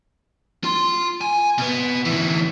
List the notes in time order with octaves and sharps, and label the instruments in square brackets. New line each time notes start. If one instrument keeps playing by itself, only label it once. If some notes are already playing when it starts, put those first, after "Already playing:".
[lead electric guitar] F4 C6
G#5
B2 B3
D2 E3